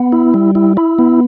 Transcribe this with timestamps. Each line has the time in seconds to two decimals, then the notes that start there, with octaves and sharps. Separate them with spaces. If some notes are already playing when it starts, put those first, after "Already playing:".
Already playing: B3
0.12 E4
0.34 G3
0.55 E4
0.77 E4
0.99 B3